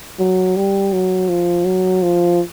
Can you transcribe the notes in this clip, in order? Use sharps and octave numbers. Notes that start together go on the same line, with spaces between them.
F#3
G3
F#3
F3
F#3
F3